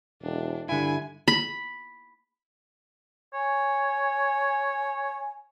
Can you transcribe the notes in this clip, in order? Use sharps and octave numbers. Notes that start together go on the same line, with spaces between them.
E1 D4
G2 D3 E4 G#5
B5
C#5 G#5